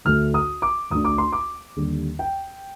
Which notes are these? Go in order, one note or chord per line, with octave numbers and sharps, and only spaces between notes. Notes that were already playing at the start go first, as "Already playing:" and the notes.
D2 D3 A3 D4 F6
D#6
D6
D2 D3 A3 D4 D#6
D6
C6
D6
D#2 D3 G3
G5